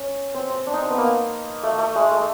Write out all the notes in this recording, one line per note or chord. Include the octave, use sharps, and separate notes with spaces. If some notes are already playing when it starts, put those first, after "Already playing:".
Already playing: C#4
C4
C4
D4
D#4
C4
B3
A#3
A3
A3
G#3
A3